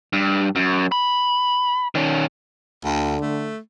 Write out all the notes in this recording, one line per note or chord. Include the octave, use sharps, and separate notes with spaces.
G2
F#2
B5
D#3 C#4
D2 D3
A3